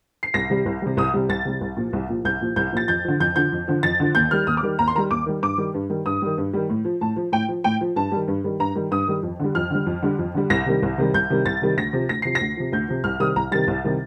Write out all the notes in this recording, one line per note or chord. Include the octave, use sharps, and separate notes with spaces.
C7
C2 A#6
C3 G3
C2
C3 G3
C2 D#6
C3 G3
C2 A6
C3 G3
C2
A#2 F3
C2
A#2 F3
C2 G6
A#2 F3
C2 G6
A#2 F3 A6
F2 G6
D3 F3
F2 G6
D3 F3 G6
F2
D3 F3
F2 A6
D3 F3
D#2 G6
D#3 G3 F6
D#2 D#6
D6
D#3 G3
D#2 A#5
C6
D#3 G3 A#5
D#2 D6
D#3 G3
G2 D6
D#3 G3
G2
D#3 G3
G2 D#6
D#3 G3
G2
D#3 G3
A2
F3
A2 A5
F3
A2 G5
F3
A2 G5
F3
G2 A5
D#3 G3
G2
D#3 G3
G2 A#5
D#3 G3
G2 D#6
D#3 G3
F2
D3 G3
F2 F6
D3 G3
F2
D3 G3
F2
D3 G3
C2 A#6
C3 D#3 G3
C2
C3 D#3 G3
C2 G6
C3 D#3 G3
C2 A6
C3 D#3 G3
D2 A#6
C3 F3
D2 A#6
C3 F3 C7
A#6
D2
C3 F3
D2 G6
C3 F3
C2 F6
C3 D#3 G3 D#6
C2 A#5
C3 D#3 G3 A6
C2
C3 D#3 G3